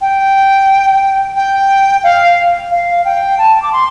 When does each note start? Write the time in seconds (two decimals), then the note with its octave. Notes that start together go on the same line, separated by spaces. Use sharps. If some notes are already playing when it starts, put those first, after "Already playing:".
0.01 G5
1.36 G5
2.04 F5
2.71 F5
3.05 G5
3.38 A5
3.62 D6
3.73 C6